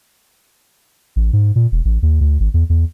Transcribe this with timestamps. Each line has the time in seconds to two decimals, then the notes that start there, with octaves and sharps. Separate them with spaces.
1.16 A1
1.33 G#2
1.56 A#2
1.72 E1
1.85 A1
2.03 D#2
2.21 D2
2.40 G#1
2.54 E2
2.70 E2